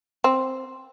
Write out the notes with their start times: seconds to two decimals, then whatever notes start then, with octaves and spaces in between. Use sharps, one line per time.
0.24 C4